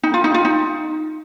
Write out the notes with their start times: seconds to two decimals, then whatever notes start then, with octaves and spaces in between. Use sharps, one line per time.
0.03 D#4
0.14 F4
0.24 D#4
0.34 F4
0.45 D#4